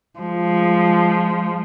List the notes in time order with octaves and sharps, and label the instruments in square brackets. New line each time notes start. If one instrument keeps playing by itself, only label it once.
[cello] F3 G#3